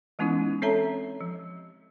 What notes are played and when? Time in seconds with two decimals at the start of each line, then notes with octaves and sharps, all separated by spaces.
0.19 E3 G#3 B3 C#4 D#4 E4
0.62 C4 A4 C#5 E5 A5 A#5
1.21 F3